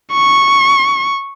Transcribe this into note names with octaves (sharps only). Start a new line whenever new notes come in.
C#6